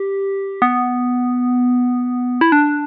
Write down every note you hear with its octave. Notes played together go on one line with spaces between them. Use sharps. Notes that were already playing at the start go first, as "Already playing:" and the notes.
Already playing: G4
B3
E4
D4